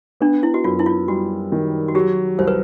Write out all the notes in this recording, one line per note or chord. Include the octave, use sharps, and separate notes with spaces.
B3 D4
E4
F#4
F#2 F4
E4
F4
G3 F#4
D#3
F#4
F#3 G4
C2 C5
B4